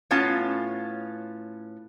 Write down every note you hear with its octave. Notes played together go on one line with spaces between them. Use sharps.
A2 B3 C#4 F4 A5